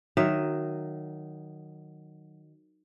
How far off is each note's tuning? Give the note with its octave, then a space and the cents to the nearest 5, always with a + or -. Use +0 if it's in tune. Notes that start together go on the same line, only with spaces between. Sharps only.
D#3 -15 F#3 +0 E5 +5